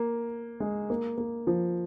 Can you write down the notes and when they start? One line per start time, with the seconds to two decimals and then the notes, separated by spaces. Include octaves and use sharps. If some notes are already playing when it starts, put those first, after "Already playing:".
Already playing: A#3
0.60 G#3
0.90 A#3
1.18 A#3
1.47 F3